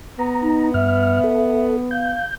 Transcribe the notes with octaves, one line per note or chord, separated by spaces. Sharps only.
B3 A#5
D#4
G2 E5 F6
A4
F5 G6